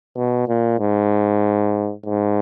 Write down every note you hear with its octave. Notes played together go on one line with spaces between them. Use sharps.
B2
A#2
G#2
G#2